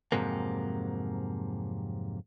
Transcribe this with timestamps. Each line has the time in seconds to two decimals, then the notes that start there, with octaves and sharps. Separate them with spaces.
0.12 F2 G#2 C3 F#3 A#3